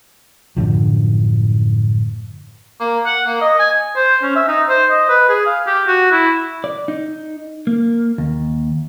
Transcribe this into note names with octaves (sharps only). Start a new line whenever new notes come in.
F#2 A2 D3 F3
A#3
F#5
A#3
D#5
G#5
C5
C#4
E5
D#4
C5
D#5
B4
G#4
F5
G4
F#4
E4
D5
D#4
A#3
D#2